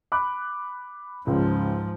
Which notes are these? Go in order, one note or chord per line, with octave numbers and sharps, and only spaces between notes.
B5 D6 F#6
C#2 G#2 F3